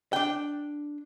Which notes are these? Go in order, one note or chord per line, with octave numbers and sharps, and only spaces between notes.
D4 G5